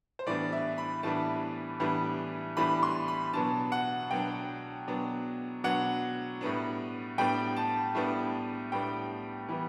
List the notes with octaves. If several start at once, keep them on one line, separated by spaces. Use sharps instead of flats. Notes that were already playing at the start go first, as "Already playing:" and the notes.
C5
A2 E3 G3 B3 D4 D5
E5
B5
A2 E3 G3 B3 D4 A5
A2 E3 G3 B3 D4
A2 E3 G3 B3 D4 B5
C6
B5
B2 F#3 B3 D4 A5
F#5
B2 F#3 B3 D4 G5
B2 F#3 B3 D4
B2 F#3 B3 D4 F#5
A2 G3 B3 D4
A2 G3 B3 D4 G5
A5
A2 G3 B3 D4
A2 G3 B3 D4 G5
E3 G3 B3